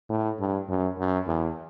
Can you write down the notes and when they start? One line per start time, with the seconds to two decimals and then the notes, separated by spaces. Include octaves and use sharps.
0.09 A2
0.40 G2
0.69 F#2
0.98 F#2
1.27 E2